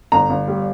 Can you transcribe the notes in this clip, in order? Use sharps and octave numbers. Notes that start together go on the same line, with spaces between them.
G1 A#5
G1
G3